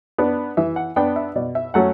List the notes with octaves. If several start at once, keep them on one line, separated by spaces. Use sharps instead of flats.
B3 D4
E3 E5
F#5
B3 D4 G5
E5
B2 D5
E5
F#3 A3 C#4 F#5